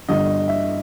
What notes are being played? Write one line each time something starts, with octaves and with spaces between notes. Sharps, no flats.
G1 G2 D3 D#5
E5